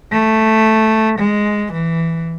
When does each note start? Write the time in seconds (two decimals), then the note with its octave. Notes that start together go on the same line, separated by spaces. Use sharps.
0.12 A3
1.19 G#3
1.72 E3